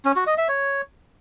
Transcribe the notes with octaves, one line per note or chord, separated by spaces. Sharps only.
C#4
F#4
D#5
E5
C#5